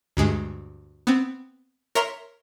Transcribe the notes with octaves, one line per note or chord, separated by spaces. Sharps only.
D2 G2 G#3
B3 C4
A#4 C#5 E5 A#5 C6 F6